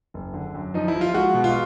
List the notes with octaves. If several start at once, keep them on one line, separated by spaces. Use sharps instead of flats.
F#1
D3
F#2
F3 D#4
E4
F3
F4
G#3 F#4
B2
F4